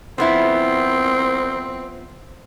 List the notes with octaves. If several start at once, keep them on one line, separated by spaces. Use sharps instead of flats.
F3 B3 C4 E4